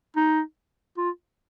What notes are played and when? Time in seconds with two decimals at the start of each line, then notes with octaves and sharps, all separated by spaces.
0.16 D#4
0.97 F4